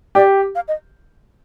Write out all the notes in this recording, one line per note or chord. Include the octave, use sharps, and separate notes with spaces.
G4 D5
F5
D#5